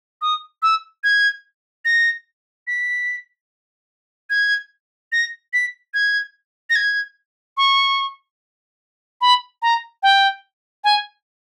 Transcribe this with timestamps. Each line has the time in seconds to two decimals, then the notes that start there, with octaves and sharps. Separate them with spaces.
0.22 D#6
0.62 E6
1.04 G#6
1.85 A#6
2.67 B6
4.30 G#6
5.12 A#6
5.53 B6
5.94 G#6
6.70 A#6
6.76 G#6
7.57 C#6
9.21 B5
9.62 A#5
10.03 G5
10.84 G#5